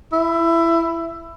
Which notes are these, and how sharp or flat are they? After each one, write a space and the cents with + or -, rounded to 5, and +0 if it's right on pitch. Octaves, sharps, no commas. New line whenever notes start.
E4 +15